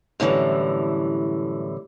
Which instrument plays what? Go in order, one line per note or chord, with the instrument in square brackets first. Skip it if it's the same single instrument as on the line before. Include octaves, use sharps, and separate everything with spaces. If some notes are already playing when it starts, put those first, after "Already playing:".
[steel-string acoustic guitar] F#2 A2 D3 E3 G3